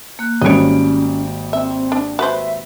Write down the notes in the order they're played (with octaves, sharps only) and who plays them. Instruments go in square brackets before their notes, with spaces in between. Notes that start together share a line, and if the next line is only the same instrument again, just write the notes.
[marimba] A#3 F#6
[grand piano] G#1 G3 D7 [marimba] A#3 F#4 [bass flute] C#4 [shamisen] C#5 D#5
[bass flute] C4 [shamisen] E5
[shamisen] D4
[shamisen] F#4 B4 C5 [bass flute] E5